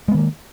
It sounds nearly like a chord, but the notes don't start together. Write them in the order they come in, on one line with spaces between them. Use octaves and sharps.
G#3 B3 D#3 A#3